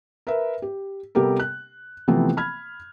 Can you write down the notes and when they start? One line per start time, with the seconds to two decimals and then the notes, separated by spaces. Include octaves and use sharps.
0.27 A#4 B4 E5
0.62 G4
1.15 C3 G3 B3 G4 A4 A#4
1.39 F#6
2.08 C3 E3 F3 A3 B3 C4
2.37 B5 F6 G#6